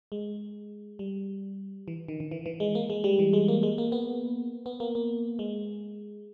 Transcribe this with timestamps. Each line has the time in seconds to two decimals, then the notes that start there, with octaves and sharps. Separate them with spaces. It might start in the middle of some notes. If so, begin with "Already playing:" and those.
0.12 G#3
0.99 G3
1.88 E3
2.08 D#3
2.20 D#3
2.31 E3
2.46 E3
2.60 G#3
2.75 A#3
2.90 G#3
3.04 G3
3.19 E3
3.33 G#3
3.48 A#3
3.63 G#3
3.78 A#3
3.92 B3
4.66 B3
4.80 A#3
4.95 A#3
5.39 G#3